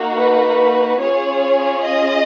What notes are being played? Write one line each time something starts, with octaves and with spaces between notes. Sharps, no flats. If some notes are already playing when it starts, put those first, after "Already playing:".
Already playing: A#3 D#4 F#4
B4
C#4 F4 G#4 C#5
D#5